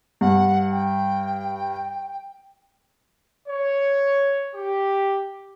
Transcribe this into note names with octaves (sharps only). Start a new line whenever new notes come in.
G2 F#5
G5
C#5
G4